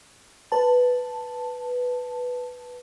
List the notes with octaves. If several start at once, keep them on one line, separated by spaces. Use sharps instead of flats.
B4 A5